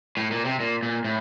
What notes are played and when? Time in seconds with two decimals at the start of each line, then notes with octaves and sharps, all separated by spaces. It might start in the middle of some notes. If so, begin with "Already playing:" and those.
0.17 A2
0.32 A#2
0.45 C3
0.60 A#2
0.83 A#2
1.05 A2